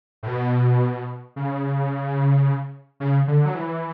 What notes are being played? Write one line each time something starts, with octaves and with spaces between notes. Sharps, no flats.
A2
B2
C#3
C#3
D3
F#3
E3